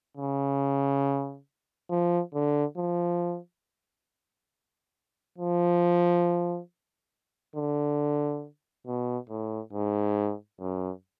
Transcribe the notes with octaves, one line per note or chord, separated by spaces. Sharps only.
C#3
F3
D3
F3
F3
D3
B2
A2
G#2
F#2